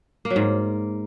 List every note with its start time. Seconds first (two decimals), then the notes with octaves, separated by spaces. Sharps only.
0.25 A#3
0.30 F#3
0.36 G#2